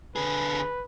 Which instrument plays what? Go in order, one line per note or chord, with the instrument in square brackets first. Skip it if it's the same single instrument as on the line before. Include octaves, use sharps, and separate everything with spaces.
[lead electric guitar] D3 G#4 [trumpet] B4